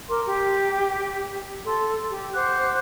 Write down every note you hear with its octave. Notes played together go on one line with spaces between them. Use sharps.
A#4 C6 D6
G4
A4 C6
G4
C5 F#5 D6 F#6